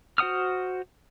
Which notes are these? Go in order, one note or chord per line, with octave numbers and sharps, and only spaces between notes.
F#4 C5 F#5 D#6 F6